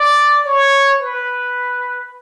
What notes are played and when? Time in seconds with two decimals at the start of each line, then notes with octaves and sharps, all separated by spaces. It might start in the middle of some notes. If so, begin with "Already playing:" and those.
Already playing: D5
0.45 C#5
1.01 B4